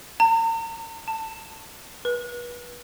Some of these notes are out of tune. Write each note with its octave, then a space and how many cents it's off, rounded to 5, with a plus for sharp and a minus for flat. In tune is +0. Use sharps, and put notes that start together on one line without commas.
A#5 -40
A5 +20
B4 -30